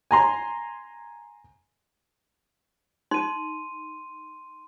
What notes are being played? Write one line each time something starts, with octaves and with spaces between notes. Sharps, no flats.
G#5 A#5 C6
D#4 C6 D#7